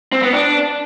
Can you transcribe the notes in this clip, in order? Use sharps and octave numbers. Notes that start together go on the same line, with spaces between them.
C4
B3
D4